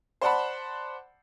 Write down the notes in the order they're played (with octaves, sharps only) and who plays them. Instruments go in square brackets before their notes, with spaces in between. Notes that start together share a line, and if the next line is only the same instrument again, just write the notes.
[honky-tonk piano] C5 D5 F#5 A5 B5